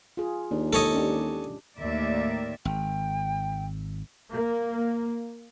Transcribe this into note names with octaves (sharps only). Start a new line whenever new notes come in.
F4 G#4
D#2 D4
G#3 A4 C#5 D#5
C#4 D4 G4
D#2 A2 D#3 A#3 D5 E5
G#1 G5
A#3